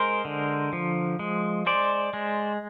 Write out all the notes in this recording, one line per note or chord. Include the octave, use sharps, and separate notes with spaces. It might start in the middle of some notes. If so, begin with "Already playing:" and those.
Already playing: G#3 A#4 C5
D3
F3
G#3
G#3 C5 D5
G#3